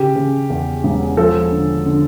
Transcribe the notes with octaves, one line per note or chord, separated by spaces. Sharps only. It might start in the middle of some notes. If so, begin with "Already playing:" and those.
Already playing: C#3 G4
C#3
E2
E1
F3 A4
D3
D3